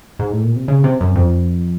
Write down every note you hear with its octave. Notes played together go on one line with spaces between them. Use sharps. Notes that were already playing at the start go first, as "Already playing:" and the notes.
G#2
A2
A#2
C3
C#3
C3
F#2
F2